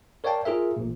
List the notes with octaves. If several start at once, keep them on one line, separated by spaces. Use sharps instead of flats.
A#4 C#5 D5 F5 G5 A5
F4 G#4 A#4 E5
A1 A#2